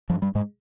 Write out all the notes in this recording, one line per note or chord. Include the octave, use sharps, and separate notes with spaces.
G2 F3
G2 G3
G#2 G#3